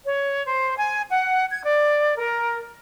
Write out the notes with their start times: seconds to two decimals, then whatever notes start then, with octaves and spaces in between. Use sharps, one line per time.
0.05 C#5
0.45 C5
0.77 G#5
1.10 F#5
1.49 G#6
1.64 D5
2.17 A#4